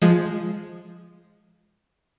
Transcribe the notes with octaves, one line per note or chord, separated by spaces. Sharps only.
F3 G#3